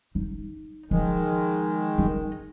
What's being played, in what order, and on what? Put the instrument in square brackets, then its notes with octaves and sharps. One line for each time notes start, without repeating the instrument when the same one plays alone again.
[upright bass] D#4
[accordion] D#3 G#3 [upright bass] F3
[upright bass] D#4